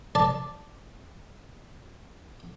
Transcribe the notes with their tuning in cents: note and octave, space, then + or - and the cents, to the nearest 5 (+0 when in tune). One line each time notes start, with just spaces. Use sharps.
D5 +0 A5 +0